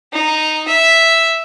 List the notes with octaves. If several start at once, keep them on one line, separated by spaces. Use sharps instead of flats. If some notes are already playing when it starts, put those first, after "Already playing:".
D#4
E5